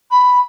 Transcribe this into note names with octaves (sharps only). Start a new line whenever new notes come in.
B5